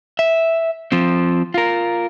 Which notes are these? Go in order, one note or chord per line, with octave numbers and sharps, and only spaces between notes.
E5
F3 C4
F4 A#4